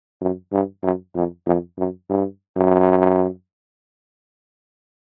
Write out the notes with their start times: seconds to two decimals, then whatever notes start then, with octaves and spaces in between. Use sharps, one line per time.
0.21 F#2
0.52 G2
0.83 F#2
1.15 F2
1.47 F2
1.78 F#2
2.10 G2
2.56 F#2